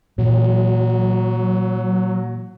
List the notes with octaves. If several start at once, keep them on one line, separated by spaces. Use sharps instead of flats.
A#2 E3 F#3